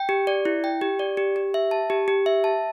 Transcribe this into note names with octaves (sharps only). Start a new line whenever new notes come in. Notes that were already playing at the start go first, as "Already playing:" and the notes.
Already playing: G5
G4
D5
E4
G5
G4
D5
G4
G4
E5
A5
G4
G4
E5
A5